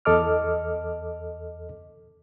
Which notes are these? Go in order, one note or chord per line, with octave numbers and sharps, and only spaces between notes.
E2 A4 D#5 D6 F6